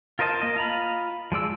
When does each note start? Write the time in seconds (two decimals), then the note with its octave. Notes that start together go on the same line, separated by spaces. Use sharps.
0.19 F4 A#4 C5 D#5 A5
0.42 A#3 D#5
0.56 F4 A#5 B5
1.32 F3 G#3 D5 E6